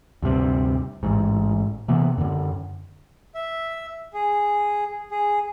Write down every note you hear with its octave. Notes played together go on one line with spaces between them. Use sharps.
D2 G2 C3
A1 G#2
C3 E3 A#3 B3
F#2 D3
E5
G#4
G#4